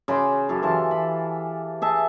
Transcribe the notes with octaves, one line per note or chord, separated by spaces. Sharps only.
C#3 B5 C6 D6
F#2 G4 A4 F5
E3 F5 A5 C6
B5
G#4 E5 A5